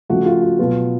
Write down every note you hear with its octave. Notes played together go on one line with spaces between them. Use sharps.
C#3 F3 A3 F#4
F4
F#4
B2 F#3 B3 F4